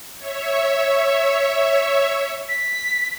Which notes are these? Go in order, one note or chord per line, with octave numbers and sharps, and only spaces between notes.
C#5 E5
B6